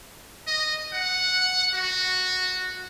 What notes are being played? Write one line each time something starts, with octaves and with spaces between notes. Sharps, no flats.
D#5
F#5
F#4